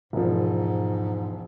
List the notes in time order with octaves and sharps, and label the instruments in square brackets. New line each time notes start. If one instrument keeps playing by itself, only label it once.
[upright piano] E1 F3 [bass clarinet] G#2